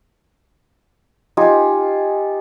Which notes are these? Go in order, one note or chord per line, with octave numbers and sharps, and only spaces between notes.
D#4 F4 G4 G#5